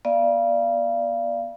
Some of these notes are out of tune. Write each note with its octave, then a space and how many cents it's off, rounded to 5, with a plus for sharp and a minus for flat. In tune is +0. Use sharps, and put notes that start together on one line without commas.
B3 -40 D5 +0 F5 -35